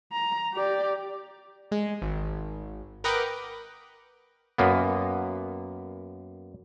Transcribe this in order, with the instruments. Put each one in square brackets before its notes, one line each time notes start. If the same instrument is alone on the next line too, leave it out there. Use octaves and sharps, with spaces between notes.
[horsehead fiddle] A#5
G4 D5
[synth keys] G#3
G#1
A#4 B4 D#5 F#5 G5 D6
[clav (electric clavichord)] F#2 A#3 B3